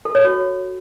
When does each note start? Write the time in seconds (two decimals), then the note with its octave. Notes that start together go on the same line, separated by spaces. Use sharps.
0.05 A4
0.15 C#5
0.24 F#4